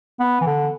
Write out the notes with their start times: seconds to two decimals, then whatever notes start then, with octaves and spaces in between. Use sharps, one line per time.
0.20 B3
0.41 E3
0.47 D3